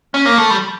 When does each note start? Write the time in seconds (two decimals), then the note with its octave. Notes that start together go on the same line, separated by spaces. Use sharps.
0.14 C#4
0.25 A#3
0.38 A3
0.50 G3